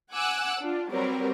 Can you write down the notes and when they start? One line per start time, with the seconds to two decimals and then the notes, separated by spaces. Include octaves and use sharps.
0.12 F#5 G#5 D6 E6 F#6
0.60 D4 F4
0.91 F#3 G3 C4 A#4 B4